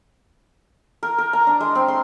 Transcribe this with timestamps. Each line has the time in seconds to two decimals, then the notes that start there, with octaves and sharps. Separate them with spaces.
1.03 A#4
1.18 A#4
1.33 A#5
1.47 D4
1.60 G#3
1.75 C4
1.88 C6